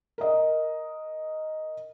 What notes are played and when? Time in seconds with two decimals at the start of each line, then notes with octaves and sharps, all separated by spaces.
0.18 A#4 D#5